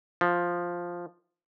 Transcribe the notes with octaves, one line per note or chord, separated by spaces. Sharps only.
F3